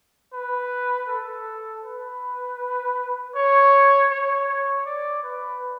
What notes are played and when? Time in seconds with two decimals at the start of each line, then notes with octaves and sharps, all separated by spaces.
0.33 B4
1.08 A4
1.84 B4
3.35 C#5
4.10 C#5
4.48 C#5
4.86 D5
5.23 B4